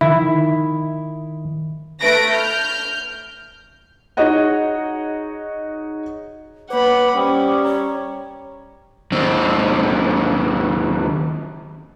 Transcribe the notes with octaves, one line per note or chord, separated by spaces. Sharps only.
D#3 E4
A3 B4 A#6 D7
F6 G6
D#4 F#4 G#4 C#5 D#5 F#5
A#3 B4 C#5 F#5 B5 D6
G3 C#4 C5 G5 D#6
C#5 A#5
D#2 C4